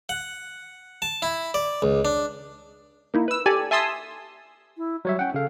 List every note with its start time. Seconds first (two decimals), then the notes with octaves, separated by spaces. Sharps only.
0.09 F#5
1.02 A5
1.22 E4
1.54 D5
1.82 C#2
2.05 D4
3.14 A#3 D#4 E4
3.28 B4 E6
3.46 G4 A4 D5 G#5
3.71 E5 G#5 A5 C6 D#6 E6
4.77 E4
5.05 F#3 G3 C#5 E5
5.19 C#4 F#5 G5
5.34 C#3 A4 F5